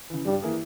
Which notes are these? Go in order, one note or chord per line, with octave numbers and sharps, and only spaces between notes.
C#3 E3
G2 G3
E3 A#3 E4 G#4